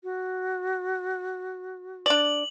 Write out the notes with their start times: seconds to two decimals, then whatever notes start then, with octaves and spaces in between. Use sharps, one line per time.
0.04 F#4
2.06 D4 D5 F#7